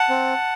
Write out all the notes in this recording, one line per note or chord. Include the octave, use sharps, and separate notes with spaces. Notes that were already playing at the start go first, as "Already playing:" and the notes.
Already playing: F#5 A5
C4